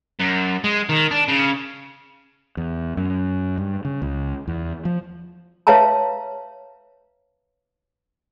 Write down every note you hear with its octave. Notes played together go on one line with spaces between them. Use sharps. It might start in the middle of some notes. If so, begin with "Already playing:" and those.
F#2
G#3
D#3
D4
C#3
E2
F#2
G2
C#3
C#2
E2
F3
B4 C#5 E5 F5 A5 A#5